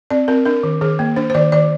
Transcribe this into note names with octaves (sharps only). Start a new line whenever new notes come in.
C4 D5
C4 A#4
D4 A#4
D#3
D#3 G#4
A#3
D4 C5
C5
D#3 D5
D#3 D5